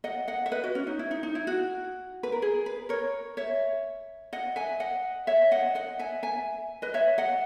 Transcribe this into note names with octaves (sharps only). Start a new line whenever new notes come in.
D#5 F#5
D#5 F#5
E5
B4 D#5
F#4
C#4
D#4
E4
D#4
D#4
E4
F#4
B4
A#4
G#4
B4
A#4 C#5
C#5 E5
D#5 F#5
E5 G#5
D#5 F#5
C#5 E5
D#5 F#5
D#5 F#5
E5 G#5
E5 G#5
B4 D#5
C#5 E5
D#5 F#5